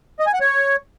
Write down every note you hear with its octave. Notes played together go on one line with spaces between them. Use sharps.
D#5
G#5
F#5
C#5